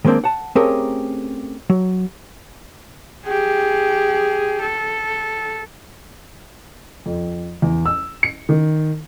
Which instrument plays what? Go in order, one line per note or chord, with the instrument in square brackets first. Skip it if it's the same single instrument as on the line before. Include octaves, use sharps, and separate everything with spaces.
[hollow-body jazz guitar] D#3 G#3 A#3 C4 D4
F#5 A5
A3 C4 C#4 G4 G#4 A#4
F#3
[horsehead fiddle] G4 G#4
A4
[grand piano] F2
E2
E6
C#7
D#3